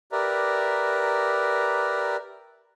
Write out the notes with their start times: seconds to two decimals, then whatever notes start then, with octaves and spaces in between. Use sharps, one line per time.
0.12 G4 A#4 B4 D5 E5 A#5